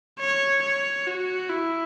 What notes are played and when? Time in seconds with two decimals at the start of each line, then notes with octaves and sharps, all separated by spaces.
0.20 C#5
0.63 C#5
1.07 F#4
1.50 E4